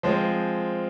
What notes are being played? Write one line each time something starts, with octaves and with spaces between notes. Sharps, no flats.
F3 G#3 C4